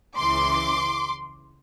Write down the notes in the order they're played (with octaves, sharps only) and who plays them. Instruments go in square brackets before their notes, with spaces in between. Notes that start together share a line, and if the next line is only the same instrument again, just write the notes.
[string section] C#2 C#3 E3 C6 D6